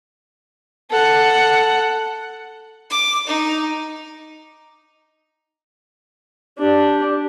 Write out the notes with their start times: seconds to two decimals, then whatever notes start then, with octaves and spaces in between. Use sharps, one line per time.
0.91 A4 F#5
2.90 D6
3.27 D#4
6.59 D4 G4